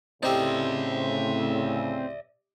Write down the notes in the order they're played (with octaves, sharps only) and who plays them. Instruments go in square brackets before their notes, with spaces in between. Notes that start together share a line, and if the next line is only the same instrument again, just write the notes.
[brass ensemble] A2 C#3 [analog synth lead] C4 [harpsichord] D#4 G4 [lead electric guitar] D5 E5